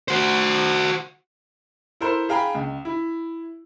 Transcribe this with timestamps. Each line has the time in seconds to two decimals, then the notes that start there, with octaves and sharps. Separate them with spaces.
0.08 F#4 C5
2.01 E4 A4 A#4 C5
2.29 G#4 F5 G5 A#5 B5
2.55 C#2
2.85 E4